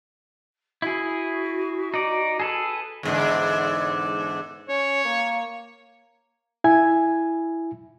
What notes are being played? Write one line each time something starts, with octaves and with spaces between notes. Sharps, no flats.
E4 F#4 G#4
D#4 D5
G#4 A4 B4
E2 G#2 D3
C#4 C#5
A#3
E4 G#5 G#6